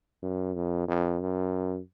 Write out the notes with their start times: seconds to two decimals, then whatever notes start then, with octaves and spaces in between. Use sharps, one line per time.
0.22 F#2
0.55 F2
0.88 F2
1.21 F#2